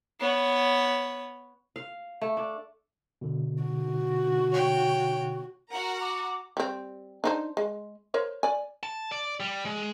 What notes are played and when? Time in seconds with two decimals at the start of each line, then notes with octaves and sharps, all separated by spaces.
0.20 B3 C#5
1.76 F5
2.21 A3
2.37 D4
3.21 B2 D3
3.62 F#4
4.52 C#5 G5
5.69 F#4 A#4 F#5 A#5
6.00 D6
6.57 G3 C4
7.24 D4 D#4 C5
7.57 G#3
8.14 A#4 C5 C#5
8.43 D5 G#5
8.83 A5
9.12 D5
9.40 G3
9.65 G#3